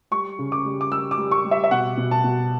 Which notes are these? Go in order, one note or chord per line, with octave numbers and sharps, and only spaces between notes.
G3 C#6
C#3
D6
G3
D6
G3 E6
D6
G3
C#6
G3
E5
E5
B2 F#5
B2
A5
B2